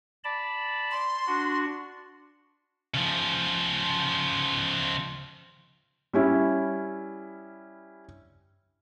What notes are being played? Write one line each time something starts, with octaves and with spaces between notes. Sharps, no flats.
D5 A5 B5
C6
D4 F#4
C#3 F3
G3 C#4 E4